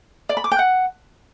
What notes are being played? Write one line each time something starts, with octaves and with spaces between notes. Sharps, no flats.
D5
B5
D6
G5
F#5